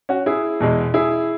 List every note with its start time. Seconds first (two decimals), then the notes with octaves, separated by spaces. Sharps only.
0.09 C#4 F#4
0.26 E4 G#4
0.60 E2 B2 G#3
0.94 E4 G#4